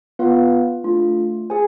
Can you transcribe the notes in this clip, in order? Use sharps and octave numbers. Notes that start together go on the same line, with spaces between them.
B3 F4 B4 F5
A3 D4 F4
G#4 C5 G#5